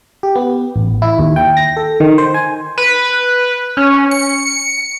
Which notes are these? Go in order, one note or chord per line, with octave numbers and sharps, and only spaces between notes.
G4
B3
A1
E4
D#2
G5
A#6
A4
D#3
C5
G#5
B4
C#4
C#7